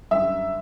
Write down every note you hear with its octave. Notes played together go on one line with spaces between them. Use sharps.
F#2 D3 G3 E5